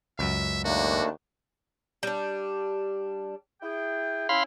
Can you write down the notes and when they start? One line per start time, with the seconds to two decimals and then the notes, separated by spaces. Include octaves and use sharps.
0.19 C#2 F#2 E5
0.65 D#2 A3 A#3 D4 F#4
2.03 G3 D4
3.62 E4 G#4 G5
4.29 C#4 E4 F5 B5 C6